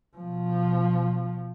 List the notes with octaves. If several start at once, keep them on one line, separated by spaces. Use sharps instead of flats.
B2 F3